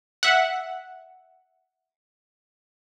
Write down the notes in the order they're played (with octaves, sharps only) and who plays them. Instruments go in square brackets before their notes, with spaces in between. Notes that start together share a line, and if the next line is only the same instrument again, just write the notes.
[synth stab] E5 F#5